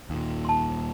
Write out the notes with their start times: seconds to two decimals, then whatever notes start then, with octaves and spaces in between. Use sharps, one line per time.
0.10 D#2 A#2
0.45 A5 C6